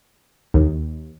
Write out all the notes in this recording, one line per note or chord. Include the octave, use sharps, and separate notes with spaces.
D#2